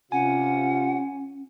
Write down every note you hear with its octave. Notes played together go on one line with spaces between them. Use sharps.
C3 C#4 F4 F#5 G#5